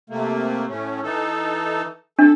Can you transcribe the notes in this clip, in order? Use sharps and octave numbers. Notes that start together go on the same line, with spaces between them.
C3 A3 A#3
A2 A3 C#4
E3 D#4 A4
D4 A4